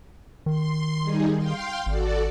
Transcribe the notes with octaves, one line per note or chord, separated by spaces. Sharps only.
D#3 C6
G3 D#4 G#4
F5 G5 C6
G#1 F#4 A4 D5